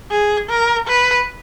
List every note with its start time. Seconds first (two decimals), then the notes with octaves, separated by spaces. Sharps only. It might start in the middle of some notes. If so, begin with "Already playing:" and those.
0.11 G#4
0.50 A#4
0.87 B4